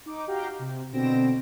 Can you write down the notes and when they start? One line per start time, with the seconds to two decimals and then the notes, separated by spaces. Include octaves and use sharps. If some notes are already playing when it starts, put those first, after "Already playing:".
0.06 D#4 D6
0.27 F#4 G4 F5 G5 A#5
0.59 C3
0.92 B2 D3 C4 A#6 D7 E7